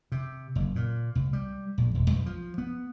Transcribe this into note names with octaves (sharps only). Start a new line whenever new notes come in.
C3
F#1
A#2
C2
G3
A#1
E1
B1
F3
B3